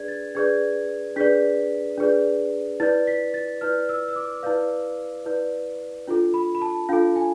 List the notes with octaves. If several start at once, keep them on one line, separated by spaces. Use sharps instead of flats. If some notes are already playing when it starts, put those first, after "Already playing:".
Already playing: D4 G#4 B4 D5 G#6
A6
D4 G#4 B4 D5 G#6
D4 G#4 B4 D5 B6
D4 G#4 B4 D5
E4 B4 D5 A6
B6
A6
E4 B4 D5 F6
E6
E6
D6
E4 B4 D5 F5
E4 B4 D5
D4 F4 A4
B5
B5
A5
D4 F4 A4 F5
G#5